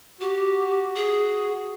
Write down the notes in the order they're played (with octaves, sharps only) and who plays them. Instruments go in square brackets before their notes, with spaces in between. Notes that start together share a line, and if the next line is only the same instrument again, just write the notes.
[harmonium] F#4 [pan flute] G4
[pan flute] G#4